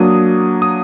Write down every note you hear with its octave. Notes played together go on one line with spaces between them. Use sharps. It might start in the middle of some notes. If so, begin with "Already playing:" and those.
Already playing: F#3 A#3 D4 D#6
D#6